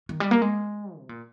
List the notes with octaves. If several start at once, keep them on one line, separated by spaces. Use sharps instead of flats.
D#3
G3
A#3
G#3
C3
A#2